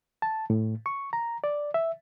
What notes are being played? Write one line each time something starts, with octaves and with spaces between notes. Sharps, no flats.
A5
A2
C#6
A#5
D5
E5